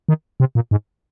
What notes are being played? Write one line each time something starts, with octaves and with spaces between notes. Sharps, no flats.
D#3
C3
A#2
G#2